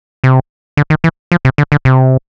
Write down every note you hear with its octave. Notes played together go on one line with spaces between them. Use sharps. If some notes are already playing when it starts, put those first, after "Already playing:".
C3
D3
D#3
E3
F3
C3
D3
D3
C3